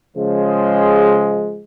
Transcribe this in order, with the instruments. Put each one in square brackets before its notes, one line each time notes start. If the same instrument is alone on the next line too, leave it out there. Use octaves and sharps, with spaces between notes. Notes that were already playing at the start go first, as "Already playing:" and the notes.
[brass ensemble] C#3 F3 G#3